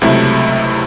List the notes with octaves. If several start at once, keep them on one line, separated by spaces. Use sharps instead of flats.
C#2 C3 F#3 A3 E4